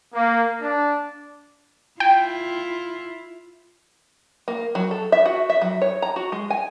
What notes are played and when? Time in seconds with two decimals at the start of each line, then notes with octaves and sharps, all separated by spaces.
0.14 A#3
0.61 D4
2.00 E4 F4 G5
4.48 A#3
4.75 F#3
4.91 A4
5.12 E5
5.25 F#4
5.50 E5
5.62 F#3
5.82 C#5
6.02 A#5
6.16 F#4
6.32 G#3
6.50 G#5